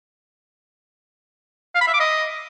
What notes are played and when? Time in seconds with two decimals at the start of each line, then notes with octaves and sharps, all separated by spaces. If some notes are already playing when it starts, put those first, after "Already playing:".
1.75 F5
1.81 B5
1.87 E5
1.94 D6
2.00 D#5